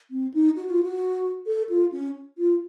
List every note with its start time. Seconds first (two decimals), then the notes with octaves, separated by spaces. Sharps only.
0.11 C4
0.34 D#4
0.56 F#4
0.70 F4
0.83 F#4
1.47 A4
1.69 F4
1.92 C#4
2.38 F4